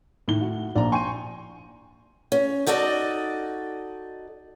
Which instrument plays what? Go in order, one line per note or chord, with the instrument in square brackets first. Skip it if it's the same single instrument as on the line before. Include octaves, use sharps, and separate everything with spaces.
[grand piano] A2 G7 [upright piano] D#3
[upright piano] F#4
[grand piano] A#1 [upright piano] D5 A#5
[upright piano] G5 G#5 C#6 [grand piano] C6 D#7
[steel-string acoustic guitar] C#4
D#4 F#4 A4 D5 D#5